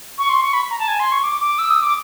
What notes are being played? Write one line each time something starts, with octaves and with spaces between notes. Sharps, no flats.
C#6
C6
C#6
B5
A#5
A5
G#5
C6
C#6
D6
D6
E6
D#6
D6